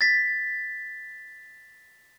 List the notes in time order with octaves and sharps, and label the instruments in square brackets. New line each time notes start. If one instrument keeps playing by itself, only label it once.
[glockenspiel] A6 B6